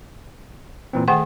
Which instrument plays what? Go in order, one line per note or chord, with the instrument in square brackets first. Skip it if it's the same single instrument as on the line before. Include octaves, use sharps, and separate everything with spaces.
[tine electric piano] A#2 E3 C4
[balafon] D#3 F#5 G5 [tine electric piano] A3 G#4